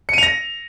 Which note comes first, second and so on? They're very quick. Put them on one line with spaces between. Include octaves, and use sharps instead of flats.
C#7 D#7 F7 A#6